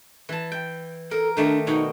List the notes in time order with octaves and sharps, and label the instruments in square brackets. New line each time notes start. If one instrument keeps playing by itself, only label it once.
[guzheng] E3 A5
G5
[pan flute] A4 [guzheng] A#4
[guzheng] D#3 A3 D5 [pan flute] D4
[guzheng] B2 [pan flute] D#4